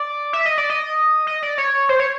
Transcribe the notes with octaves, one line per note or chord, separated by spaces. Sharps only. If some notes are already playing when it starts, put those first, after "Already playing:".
Already playing: D5
E5
D#5
D5
D#5
D#5
D5
C#5
C5
C#5